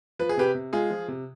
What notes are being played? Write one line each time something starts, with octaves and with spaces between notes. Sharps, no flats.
F3 B4
G#4
C3 G4 B4
C3
G#3 F4 G#4
F3
C3